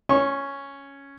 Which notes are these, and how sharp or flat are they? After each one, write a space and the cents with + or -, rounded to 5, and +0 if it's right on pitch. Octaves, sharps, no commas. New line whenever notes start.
C#4 +0 C#6 -30